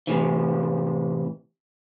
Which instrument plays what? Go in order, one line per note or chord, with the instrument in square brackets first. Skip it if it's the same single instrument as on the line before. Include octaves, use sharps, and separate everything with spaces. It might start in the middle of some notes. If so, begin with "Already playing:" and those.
[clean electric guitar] A2 C3 E3